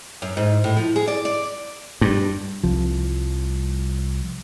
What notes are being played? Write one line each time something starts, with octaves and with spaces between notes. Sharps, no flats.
F#2
G#2
A2
F3
G#4
D5
D5
G2
C2 F3